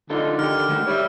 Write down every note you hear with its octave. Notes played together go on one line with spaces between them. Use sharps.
D3 D#4 F4 A4
D#3 G4 F6
D#3 A3 F#4
G3 C#5 E5